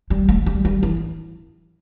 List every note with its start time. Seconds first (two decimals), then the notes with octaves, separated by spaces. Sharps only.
0.10 G3
0.29 A3
0.46 G3
0.65 G3
0.83 E3